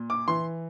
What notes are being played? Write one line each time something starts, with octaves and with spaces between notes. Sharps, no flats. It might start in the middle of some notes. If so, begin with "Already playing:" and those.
Already playing: A#2
D6
E3 C6